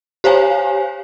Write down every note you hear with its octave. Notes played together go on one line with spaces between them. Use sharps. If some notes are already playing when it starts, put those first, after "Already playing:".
G4 C5 C#5 F5 G#5